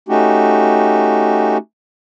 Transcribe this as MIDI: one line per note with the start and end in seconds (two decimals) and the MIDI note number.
0.09 1.57 57
0.09 1.57 61
0.09 1.57 63
0.09 1.57 66
0.09 1.57 67